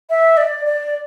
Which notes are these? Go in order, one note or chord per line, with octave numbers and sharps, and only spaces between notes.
E5
D5
D5